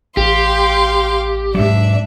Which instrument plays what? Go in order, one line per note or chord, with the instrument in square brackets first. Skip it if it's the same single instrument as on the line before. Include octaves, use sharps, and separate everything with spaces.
[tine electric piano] A1 [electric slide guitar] G4 [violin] F5 C6
[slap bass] G#2 F#3 [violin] D4 E5